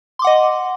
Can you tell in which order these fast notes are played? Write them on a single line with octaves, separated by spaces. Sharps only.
C6 D6 F#5 D#5